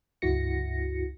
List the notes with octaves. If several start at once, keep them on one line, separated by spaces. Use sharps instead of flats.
C#2 G2 E4 F#4 A#6 C#7